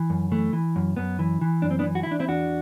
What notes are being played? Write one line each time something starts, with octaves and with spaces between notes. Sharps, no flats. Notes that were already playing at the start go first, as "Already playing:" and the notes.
Already playing: E3
F#2
E3 A3
E3
F#2
F#2 B3
E3
E3
F#2 D4
C4
B3 D4
E3
F#4
E4
E3 D4
C4 E4
E2 D4 F#4